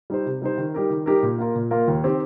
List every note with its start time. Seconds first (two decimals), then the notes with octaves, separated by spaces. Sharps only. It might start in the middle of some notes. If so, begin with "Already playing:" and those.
0.10 G3 D#4 C5
0.26 C3
0.42 G3 D#4 C5
0.58 D#3
0.74 G3 D#4 G4 A#4
0.90 D#3
1.06 G3 D#4 G4 A#4
1.23 A#2
1.38 A#3 F4 A#4
1.55 A#2
1.71 A#3 F4 A#4
1.88 D#2
2.04 D#3 C4 G4